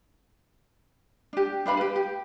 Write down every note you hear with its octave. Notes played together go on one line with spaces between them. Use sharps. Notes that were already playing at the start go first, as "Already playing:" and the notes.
D4 G4
D4 B4 F5 B5
G4 B4
G4